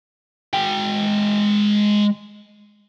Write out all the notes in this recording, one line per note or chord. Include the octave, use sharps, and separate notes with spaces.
G#3 G5